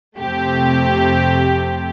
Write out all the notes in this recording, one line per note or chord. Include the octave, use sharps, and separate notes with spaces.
F2 C3 A3 C4 G4